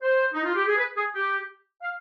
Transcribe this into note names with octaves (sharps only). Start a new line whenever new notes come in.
C5
D#4
F4
G4
G#4
B4
G#4
G4
F5